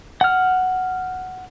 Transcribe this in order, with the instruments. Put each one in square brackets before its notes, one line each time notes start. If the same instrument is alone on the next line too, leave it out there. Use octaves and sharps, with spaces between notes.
[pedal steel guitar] F#5 F6